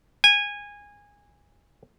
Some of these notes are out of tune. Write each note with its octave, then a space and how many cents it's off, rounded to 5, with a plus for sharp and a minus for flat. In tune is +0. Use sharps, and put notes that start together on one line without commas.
G#5 -20